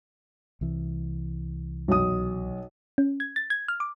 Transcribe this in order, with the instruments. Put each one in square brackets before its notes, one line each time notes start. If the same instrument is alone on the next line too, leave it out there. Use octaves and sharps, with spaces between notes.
[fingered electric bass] C2 E3
[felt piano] B1 D#6
[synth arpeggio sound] C#4
G#6
A6
G#6
F6
D6